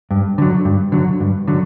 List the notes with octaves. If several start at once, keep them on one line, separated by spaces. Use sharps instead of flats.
G2
D3 F#3
G2
D3 F#3
G2
D3 F#3